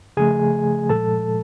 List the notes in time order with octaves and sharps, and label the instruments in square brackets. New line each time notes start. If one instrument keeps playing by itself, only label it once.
[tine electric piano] C#3 F3 A3 G#4 G#5
A#2 F3 G#3 A4 A5